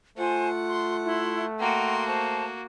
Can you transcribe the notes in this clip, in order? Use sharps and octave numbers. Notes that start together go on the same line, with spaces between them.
A3 F4 C5 F#5 G#5
C6
E4 C6
A#3 F#4 F#5 G5 A#5 C6
C5 A5